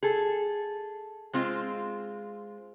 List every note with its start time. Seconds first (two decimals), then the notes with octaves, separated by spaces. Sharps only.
0.03 G#4 A4
1.33 G#3 C4 F4